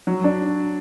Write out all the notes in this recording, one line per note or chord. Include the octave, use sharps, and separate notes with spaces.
F#3
D4